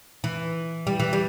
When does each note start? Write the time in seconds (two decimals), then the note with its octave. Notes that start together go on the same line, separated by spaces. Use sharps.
0.24 E3
0.87 G3
0.99 E3
1.13 G3